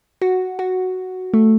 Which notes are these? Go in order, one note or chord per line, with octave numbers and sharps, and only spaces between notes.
F#4
F#4
A3